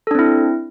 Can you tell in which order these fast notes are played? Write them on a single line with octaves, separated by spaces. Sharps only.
A4 D4 C4 E4